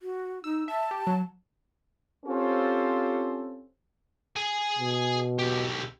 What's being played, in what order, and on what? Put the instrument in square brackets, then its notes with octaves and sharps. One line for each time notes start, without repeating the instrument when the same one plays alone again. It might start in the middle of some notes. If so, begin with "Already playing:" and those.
[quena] F#4
[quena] D#4 [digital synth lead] E6
[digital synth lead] E5 [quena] A5
[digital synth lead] G4
F#3
[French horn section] C4 C#4 F4 G4 A4 C5
[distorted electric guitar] G#4 G#5
[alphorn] B2
[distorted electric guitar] B1 G4